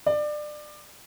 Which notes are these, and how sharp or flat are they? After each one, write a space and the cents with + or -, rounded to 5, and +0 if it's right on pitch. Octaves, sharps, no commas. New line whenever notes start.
D5 +25